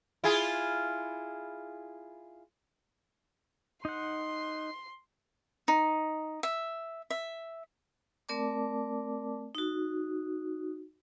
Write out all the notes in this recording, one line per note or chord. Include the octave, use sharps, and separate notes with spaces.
E4 F4 G#4
D#4 F#5 C6
D#4
E5
E5
A3 C4 A#4 D5 A5 D6
D#4 F#4